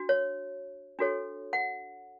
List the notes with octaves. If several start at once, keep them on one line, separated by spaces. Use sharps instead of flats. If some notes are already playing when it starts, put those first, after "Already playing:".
Already playing: D4 F#4
C#5
D4 F#4 A4 C#5
F#5